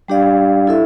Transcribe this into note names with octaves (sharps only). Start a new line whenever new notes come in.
G3 D4 G4 D5 F5
E4 A4 E5